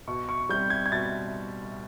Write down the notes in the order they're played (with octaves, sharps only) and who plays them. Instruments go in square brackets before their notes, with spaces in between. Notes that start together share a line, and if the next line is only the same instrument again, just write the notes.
[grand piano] B2 C#6
C#6
G3 C4 G6
G#6
G#6
B2 A6